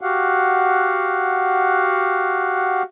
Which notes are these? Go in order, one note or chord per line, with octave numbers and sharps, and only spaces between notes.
F#4 G4 F5 F#5